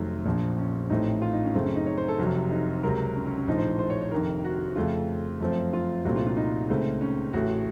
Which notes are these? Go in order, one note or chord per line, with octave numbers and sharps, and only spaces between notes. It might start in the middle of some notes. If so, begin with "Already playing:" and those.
Already playing: F1 F2 D#3 F#3 A3 A4
A#1 A#2 F3
C#4
A1 A2 A3 C4 D#4
F4
D#4
C#4
F#2 C#3 A3 C4
C#4
D#4
C#5
C5
A4
F1 F2 C3 F#3 F#4
D#4
C#2 C3 F#3 A#4
C#4
C#4
C#4
A#1 A2 F3 D#4
C5
C5
C#5
C#5
F1 F2 D#3 A#4
F#4
F2 C#3 A3 F4
F#2 F3 A3 C4
F4
C2 A#2 A3 C4 F#4
F4
F4
D#4
C#2 C#3 A3 C4
C#4
A1 A2 A3 F#4